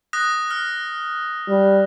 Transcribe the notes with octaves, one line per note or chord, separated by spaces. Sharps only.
D#6 F#6 A#6
F6
G3